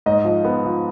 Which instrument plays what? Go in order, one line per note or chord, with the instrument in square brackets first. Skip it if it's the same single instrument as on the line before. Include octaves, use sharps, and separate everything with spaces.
[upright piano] G#2 D#5
F3
B3
F3